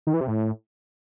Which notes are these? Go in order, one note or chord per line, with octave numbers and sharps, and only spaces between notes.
D#3
E3
C3
A2